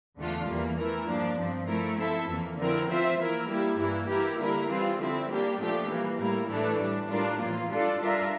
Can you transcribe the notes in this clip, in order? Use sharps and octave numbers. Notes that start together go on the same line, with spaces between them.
E2 D3 A3 D4 F4
E2 E3 G3 A#3
E3 A3 E4 A#4
G2 F3 A#3 D4
G2 F3 C4
F3 A3 E4 A#4
F3 C4 E4 A4 E5
F2 E3 A#3
D3 F3 C4 E4 A#4
F3 C4 F4 C5 E5
E3 A#3 E4 A#4
G3 A#3 E4 G4
G2 E3 A#3 E4
E3 A#3 E4 G4 A#4
D3 G3 A#3 E4 A#4
E3 G3 C4 F4
D3 F3 C4 E4
G3 A#3 D4 G4
A#2 F3 A3 D4 G4
E3 G3 A#3
A2 G3 A#3 E4 A#4
A2 E3 A3 D4 A4
A2 G3 D4
A2 G3 D4 F4 A#4
A2 E3 A#3 F4
G3 D4 F4 A4 D5
G3 D4 F4 A#4 E5